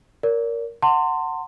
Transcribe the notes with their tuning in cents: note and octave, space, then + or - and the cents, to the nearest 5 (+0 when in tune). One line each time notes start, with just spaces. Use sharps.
A#4 +0 D5 -40
F#5 +0 A5 +40 C6 +0